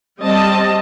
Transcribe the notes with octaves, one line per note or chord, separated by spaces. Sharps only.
G3 C4 D#5 A5